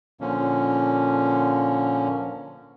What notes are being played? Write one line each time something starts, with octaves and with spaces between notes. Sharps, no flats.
A#2 D3 F3 A#3 C#4